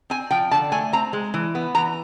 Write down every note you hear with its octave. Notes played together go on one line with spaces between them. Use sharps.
C4 G#5
F3 G5
D3 A5
A3 G#5
C4 A#5
G#3
E3
B3
E3 A#5